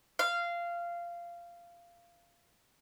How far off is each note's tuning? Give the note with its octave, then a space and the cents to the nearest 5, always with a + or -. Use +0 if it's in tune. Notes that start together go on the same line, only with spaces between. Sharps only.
F5 -15